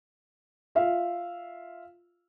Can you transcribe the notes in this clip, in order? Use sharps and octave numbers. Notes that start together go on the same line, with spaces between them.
F4 E5 F5